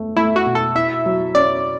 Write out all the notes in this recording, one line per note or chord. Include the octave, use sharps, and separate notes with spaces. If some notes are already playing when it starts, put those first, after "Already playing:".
Already playing: A3
A3 E4
F#4
B2
A4
E4 E5
F#3
C#4 D5